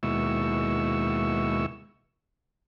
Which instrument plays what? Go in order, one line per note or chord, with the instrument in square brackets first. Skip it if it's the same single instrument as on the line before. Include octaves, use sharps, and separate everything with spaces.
[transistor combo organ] D#2 B2 G#3 E4 C#6 E6